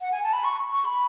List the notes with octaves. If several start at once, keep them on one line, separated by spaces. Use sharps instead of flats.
F#5
G#5
A5
B5
C#6
C#6
B5